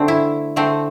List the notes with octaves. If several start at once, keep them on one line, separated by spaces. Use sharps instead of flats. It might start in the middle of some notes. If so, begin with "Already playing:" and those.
Already playing: D3 A3 C4 D4
E4
D3 A3 C4